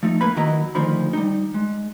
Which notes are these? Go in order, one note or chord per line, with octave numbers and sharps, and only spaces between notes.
F3 A3 D#4
A#3 B4 B5
D#3 F#3 E4 D#5 A#5
D2 D#3 F3 B5
G3 D#4
G#3